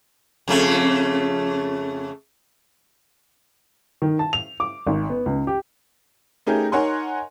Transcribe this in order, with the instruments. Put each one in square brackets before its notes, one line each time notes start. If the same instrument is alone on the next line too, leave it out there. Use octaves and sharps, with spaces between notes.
[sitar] F2 C#3 A3
[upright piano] D#3
A5
F7
D6
G#1
B3
C#2
G4
[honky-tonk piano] A3 C#4 D#4 G4 G#4 A#4
D#4 A#4 C#5 F#5 G#5 C6